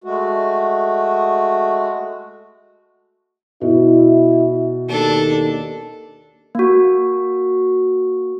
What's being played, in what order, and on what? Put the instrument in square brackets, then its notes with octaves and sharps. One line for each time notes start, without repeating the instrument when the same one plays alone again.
[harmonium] G#3 A3 F#4
[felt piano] B2 [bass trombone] E4
[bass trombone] D#2 [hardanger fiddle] D4 A4
[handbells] A#3 F#4